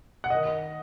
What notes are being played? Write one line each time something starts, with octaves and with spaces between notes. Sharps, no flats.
F#5
D#3 D#5